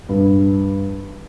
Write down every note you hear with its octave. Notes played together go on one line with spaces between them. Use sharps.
G2